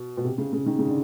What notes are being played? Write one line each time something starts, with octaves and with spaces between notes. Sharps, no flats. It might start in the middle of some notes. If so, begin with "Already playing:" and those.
Already playing: B2
B2
C3
C#3
C#3
D#3
C#3
D3